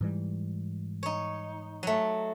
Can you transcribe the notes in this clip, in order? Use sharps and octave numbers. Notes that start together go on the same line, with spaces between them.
G#2 E3 G3
D#4 C#5
F#3 A3